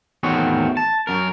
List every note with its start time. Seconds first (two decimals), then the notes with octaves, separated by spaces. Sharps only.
0.23 E2 A2 D#3 C4 F#4 C#5
0.77 A5
1.07 F#2 A#4